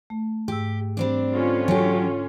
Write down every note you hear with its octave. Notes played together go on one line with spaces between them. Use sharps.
A3
G#2 G4 E6
G3 C4 D4
D3 C#4 F4
F#3 G4 A4 C#5 G#5